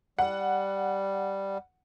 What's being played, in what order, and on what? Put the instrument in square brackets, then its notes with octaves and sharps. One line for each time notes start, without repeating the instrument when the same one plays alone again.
[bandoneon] G3 [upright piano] F#5